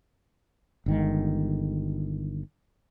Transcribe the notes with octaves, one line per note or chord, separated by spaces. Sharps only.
G1 D#3 G#3